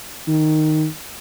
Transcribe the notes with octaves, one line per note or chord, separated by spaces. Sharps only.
D#3